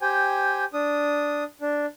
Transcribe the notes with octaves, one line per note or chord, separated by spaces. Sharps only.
G4 C5 G5 G#5
D4 D#6
D4